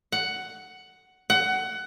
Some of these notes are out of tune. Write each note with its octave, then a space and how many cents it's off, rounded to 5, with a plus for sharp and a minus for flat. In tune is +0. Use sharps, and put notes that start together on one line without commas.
F#5 +10
F#5 +20